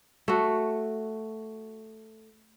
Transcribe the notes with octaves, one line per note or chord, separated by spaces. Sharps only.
A3 F#4